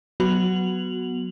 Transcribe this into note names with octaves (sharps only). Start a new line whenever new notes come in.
F#3 B3 F#4 F7 F#7